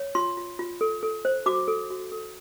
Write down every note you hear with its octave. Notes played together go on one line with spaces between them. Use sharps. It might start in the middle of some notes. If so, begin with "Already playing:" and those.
Already playing: C#5
F4 C6
F4
F4
A4
A4
C5
F#4 D6
A4
F#4
A4